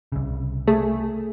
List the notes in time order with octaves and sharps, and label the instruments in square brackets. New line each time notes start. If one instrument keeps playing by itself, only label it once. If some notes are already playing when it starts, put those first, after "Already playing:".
[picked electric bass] C2 C#3
[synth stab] A3 G#4